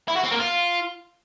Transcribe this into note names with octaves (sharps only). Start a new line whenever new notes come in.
E4
F#4
C4
A#3
F4